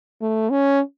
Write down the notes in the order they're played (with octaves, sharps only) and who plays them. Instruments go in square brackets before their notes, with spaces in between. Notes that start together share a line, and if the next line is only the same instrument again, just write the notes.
[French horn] A3
C#4